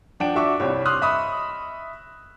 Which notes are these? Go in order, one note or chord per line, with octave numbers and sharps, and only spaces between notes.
F3 D4 F#5 G5 D7
D4 F#4 E5 C#6 D6
C2 G3 C4 C#5
C6 D6 D#6 F6 F#6
D#5 E5 B5 C#6 D#6